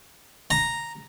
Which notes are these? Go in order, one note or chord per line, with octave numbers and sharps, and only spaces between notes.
A#5